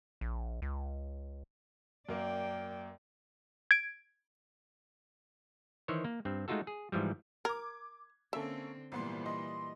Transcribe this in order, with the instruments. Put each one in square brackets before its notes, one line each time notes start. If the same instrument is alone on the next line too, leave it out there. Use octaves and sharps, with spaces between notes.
[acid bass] A#1
C#2
[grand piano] F#2 A#3 [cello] D5 G5
[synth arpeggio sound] G#6 D7
[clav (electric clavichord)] D#3 E3 C5 C#5
A#3
G2 C4
G#3 A3 D#4 F4 F#4 A4
G#4
G#2 E3 F3 G3
[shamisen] A#4 [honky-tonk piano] D6 G#6
[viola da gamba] D3 C4 [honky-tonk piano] A#3 C#4 A4 [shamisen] E5
[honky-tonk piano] G#1 B3 C6 [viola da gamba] A#2 E3 G3
[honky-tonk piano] D#5 [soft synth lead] C6